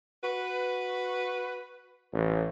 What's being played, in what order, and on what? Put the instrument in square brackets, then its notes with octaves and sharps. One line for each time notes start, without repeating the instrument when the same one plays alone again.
[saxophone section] F#4 B4
[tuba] A1